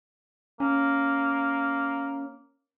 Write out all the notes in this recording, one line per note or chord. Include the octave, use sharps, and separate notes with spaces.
A#3 C#4